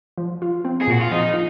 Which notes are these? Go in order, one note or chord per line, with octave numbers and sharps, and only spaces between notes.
F3
F4
C4
G#4
A#2 F#4
F4
F3 D#4
F4